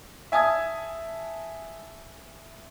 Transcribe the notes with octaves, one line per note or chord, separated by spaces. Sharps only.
E5 G#5 A5 D#6 G#6